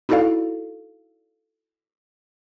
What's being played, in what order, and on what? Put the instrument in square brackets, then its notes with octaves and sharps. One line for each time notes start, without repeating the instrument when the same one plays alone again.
[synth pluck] D#4 E4 F#4 A4 D5 F5